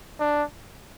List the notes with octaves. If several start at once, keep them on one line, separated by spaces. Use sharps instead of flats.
D4